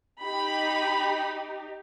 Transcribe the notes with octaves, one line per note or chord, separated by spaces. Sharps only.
D#4 G4 B5